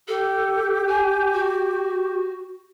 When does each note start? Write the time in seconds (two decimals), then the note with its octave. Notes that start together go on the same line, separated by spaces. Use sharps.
0.08 G4 A4
0.89 G#5
1.33 F#4